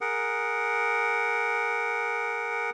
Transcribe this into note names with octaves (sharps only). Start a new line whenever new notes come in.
G#4 A#4 F#5